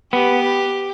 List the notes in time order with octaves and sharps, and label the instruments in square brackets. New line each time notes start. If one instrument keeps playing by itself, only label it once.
[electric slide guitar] B3 [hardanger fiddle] G4